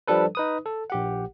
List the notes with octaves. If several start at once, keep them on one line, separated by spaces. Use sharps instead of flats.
F3 G3 D4 A4 B4
D#4 B4 D#6
A4
A#1 G4 F#5